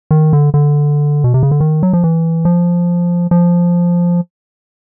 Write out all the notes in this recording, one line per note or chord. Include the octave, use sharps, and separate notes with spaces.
D#3
D3
D3
B2
C3
C#3
D3
D#3
F#3
F3
E3
F3
F3